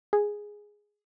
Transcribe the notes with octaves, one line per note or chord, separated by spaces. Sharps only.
G#4